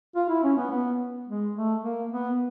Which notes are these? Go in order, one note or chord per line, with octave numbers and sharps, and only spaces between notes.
F4
E4
C#4
B3
B3
G#3
A3
A#3
B3